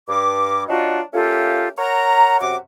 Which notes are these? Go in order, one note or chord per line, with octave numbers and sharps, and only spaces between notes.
G2 D6
F#3 D4 D#4 F4 F#4
A3 A#3 C#4 F4 G4 A4
A#4 C#5 F#5 A#5
F#2 C3 F#4 D6